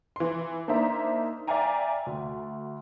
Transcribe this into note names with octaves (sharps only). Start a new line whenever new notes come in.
E3 C6
A#3 D4 D#4 C5 E5 A#5
D5 E5 F5 G5 G#5 A#5
D2